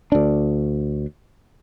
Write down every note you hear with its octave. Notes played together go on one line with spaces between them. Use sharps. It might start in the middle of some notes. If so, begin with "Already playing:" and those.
D2 D4